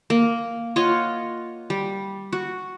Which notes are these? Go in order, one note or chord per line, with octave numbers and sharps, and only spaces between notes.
A#3
F4 C#5 D#5 F#5
G3
F#4